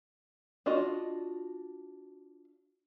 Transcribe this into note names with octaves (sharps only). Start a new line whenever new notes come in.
D4 F4 F#4 D#5